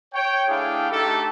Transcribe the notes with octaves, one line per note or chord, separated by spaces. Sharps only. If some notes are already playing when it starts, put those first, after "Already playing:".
C#5 G5
A3 D4 E4 G#4 F5 G5
A3 D4 D#4 G4 A4